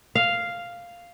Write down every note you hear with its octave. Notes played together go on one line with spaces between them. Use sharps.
F5